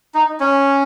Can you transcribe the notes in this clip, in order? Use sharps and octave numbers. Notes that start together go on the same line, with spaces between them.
D#4
C#4